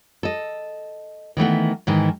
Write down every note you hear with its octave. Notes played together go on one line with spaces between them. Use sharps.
A4 D#5
D#3 E3 A3 B3
G#2 D#3 E3